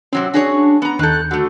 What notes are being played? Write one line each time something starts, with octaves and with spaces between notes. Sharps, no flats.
C3 F#3 C4 C#4
D4 F#4 G#4 C#5
B3 A#5
D#2 D#3 A4 F#6 G6
D3 A3 F#4